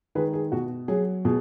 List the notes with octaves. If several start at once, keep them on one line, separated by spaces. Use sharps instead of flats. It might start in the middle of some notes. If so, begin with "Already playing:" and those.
D#3 G#3 G#4 B4
G#4
B2 F#4
F#3 G#4
B2 G#4